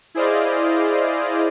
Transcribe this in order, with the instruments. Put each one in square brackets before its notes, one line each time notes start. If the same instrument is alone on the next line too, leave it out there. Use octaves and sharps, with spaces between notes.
[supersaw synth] E4 G#4 C5 D5 D#5 F5